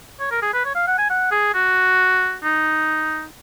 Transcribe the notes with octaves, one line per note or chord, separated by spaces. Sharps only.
C#5
A#4
G#4
B4
C#5
F5
F#5
G#5
F#5
G#4
F#4
D#4